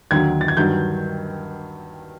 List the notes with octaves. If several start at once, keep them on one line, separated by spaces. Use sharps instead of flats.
D#2 D3 F#3 G#6
A6
G#6
G2 D#3 F#3 G6